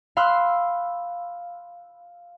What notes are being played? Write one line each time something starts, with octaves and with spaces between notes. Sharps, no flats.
F5 B5 C6 E6 F#6